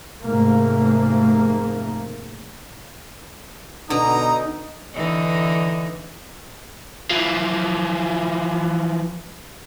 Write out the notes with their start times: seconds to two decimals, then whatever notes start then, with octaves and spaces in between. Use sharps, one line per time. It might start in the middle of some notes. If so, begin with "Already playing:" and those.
0.25 F1 G#2 A3 A#3
3.90 B2 D3 D#4 A#5 D#6
4.94 D3 E3 D#4
7.11 E3 F3